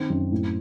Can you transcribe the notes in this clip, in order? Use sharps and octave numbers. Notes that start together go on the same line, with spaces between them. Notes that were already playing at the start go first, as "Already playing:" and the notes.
Already playing: D#3 C4
F#2
A2